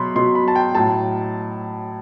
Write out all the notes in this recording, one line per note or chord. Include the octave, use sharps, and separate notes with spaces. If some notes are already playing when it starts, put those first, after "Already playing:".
Already playing: B2 F#3 B5 C6
B2 F#3 C6
B5
A5
G5
A2 F#3 A5